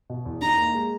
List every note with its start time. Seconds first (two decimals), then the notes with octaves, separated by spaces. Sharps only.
0.10 B2
0.26 E2
0.42 D#4 A#5
0.58 A#3
0.75 G#3